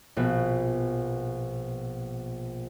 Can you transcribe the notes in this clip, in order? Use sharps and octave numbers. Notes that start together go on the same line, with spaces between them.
A#1 B2 B3